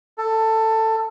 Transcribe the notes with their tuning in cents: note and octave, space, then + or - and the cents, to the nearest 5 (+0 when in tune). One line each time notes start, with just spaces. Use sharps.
A4 +15